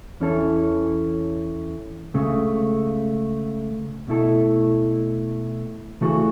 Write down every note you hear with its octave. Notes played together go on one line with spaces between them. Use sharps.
E2 E3 C#4 E4 A4
C#2 C#3 A3
B2 A3 E4 A4
C#3 E3 A3 F#4 A4